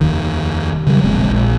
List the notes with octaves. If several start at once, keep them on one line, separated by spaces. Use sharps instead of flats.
F1 D#2 D#3
C#3 F#3 G3
E1 A#1 G#3 C4
A#1